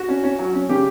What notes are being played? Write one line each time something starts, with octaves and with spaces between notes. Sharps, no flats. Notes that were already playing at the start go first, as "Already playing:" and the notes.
Already playing: F#4
C#4
C#4
F#3
C#4
C#3 G4